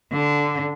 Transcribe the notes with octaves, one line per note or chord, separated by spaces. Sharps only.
D3